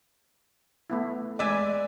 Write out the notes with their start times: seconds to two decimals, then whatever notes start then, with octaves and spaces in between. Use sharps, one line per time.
0.90 A3 B3 E4
1.39 G#3 B4 D5 E5 G#5